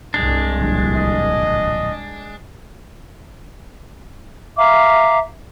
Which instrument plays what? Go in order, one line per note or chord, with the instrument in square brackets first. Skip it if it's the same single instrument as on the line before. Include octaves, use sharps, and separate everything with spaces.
[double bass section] C2 G2 [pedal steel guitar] G#3 D4
[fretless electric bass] D1 A#1
[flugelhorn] D#5
[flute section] E5 F5 A#5 D6